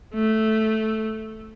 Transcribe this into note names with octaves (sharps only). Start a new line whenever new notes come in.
A3